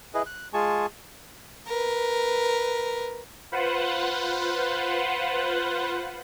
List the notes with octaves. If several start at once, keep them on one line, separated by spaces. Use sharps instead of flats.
E4 G#4 B4 D#5
F#6
G#3 F4 G#4 G#5 A5 C#6
A#4 B4
F4 B4 C5 F#5